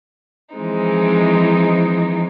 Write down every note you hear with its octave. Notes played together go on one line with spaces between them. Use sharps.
E3 F3 G#3 C4 D#4